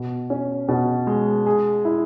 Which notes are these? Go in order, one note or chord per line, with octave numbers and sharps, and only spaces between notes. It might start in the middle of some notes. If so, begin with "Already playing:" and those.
Already playing: B2
C#4
B2
G#3
G#4
E4